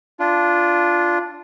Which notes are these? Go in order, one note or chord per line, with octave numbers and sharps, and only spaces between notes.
D4 F4